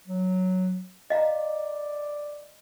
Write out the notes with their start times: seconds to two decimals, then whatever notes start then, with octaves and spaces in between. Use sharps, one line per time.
0.07 F#3
1.10 D5 D#5 F5 A#5